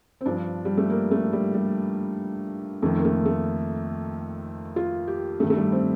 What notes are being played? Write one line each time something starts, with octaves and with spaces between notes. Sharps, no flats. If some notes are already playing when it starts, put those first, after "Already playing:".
C4
G2 F3 D4
G3
A3
A#3
A3
G3
G3
F2 D#3 A3
A#3
A3
A3
F4
G4
G2 D#3 A3
A3
G3
C4